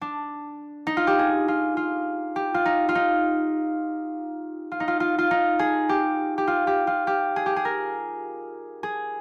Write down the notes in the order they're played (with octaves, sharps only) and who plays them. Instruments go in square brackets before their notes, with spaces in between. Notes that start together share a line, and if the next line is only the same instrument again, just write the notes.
[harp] D4
D#4
F4
G4
G#4
F4
F4
G4
F4
D#4
F4
D#4
F4
D#4
F4
F4
F4
D#4
G#4
G4
G4
F4
G4
F4
G4
G#4
G4
G#4
A#4
G#4